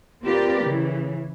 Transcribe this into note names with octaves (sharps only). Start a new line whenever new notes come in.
C4 F4 G4 A#4 B4 D5
C#3 E3